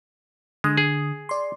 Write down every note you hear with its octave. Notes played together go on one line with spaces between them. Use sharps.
D3 G#3 D#6
G#4
D5 C6